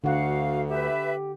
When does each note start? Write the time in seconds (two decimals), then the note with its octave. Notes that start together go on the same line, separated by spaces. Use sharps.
0.04 D2 D3 F#4 F5 F#5
0.69 G4 B4 E5